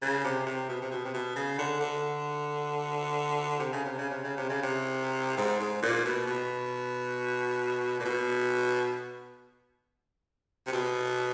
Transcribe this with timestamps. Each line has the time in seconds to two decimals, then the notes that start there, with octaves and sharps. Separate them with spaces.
0.02 C#3
0.24 C3
0.46 C3
0.69 B2
0.82 C3
0.92 B2
1.05 C3
1.14 B2
1.36 C#3
1.59 D3
1.80 D3
3.60 C3
3.73 C#3
3.85 C3
3.98 C#3
4.10 C3
4.24 C#3
4.37 C3
4.50 C#3
4.63 C3
5.38 G#2
5.60 G#2
5.83 A#2
6.05 B2
6.27 B2
8.00 A#2
8.05 B2
10.67 C3
10.73 B2